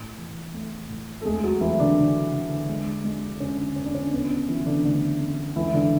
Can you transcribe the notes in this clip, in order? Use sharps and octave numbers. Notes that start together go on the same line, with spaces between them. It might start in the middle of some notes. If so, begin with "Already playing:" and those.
Already playing: A2
E3
A3
A2
A4
G#3 A3 G#4
F#3 F#4
E3 A3 E4
D3 D4
D3
D3
G#3
G#3
D3 C#4
D3 C#4
D4
C#4
C#3 B3
C#4
E3 F#3 E4
D3 D4
D3 A3 D4
C#3
E3 G#3 E4
D3 D4